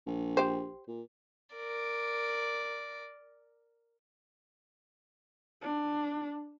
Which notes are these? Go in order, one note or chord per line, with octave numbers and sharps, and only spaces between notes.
A#1
G4 C5
A#2
A#4 D5
D4